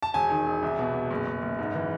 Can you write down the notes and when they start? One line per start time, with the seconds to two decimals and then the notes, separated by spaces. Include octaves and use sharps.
0.02 A5
0.14 E1 G#5
0.30 D#3
0.46 E1
0.63 C2
0.79 B2
0.94 B2
1.11 F#1
1.27 F#1
1.42 F#1
1.59 G#2
1.75 E3